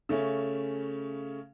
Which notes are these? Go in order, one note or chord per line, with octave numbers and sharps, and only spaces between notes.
C#3 A3 C#4